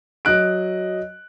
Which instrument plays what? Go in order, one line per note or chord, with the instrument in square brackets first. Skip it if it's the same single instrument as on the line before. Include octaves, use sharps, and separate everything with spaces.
[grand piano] F#3 D#5 F#6 D7